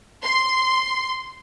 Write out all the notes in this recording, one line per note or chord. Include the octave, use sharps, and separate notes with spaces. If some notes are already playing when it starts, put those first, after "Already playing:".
C6